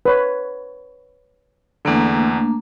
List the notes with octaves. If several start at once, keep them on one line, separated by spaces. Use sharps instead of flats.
B4 C#5
E2 D3 A3 A#3 D4